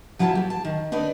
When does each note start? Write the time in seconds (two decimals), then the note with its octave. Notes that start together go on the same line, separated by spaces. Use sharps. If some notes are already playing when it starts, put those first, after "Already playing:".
0.19 F3 F#3 E4 F4 G#5 A5
0.35 G4
0.50 A5
0.65 D#3
0.92 D4 D#4 B4 D5